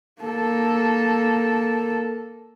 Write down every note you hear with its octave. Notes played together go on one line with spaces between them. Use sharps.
A#3 A4